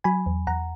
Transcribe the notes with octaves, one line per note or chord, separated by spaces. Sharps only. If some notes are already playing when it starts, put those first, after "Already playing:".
F#3 G#5 B5
E2
E2 F#5 A#5